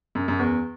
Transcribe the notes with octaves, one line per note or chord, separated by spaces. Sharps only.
F#2
F#2
E2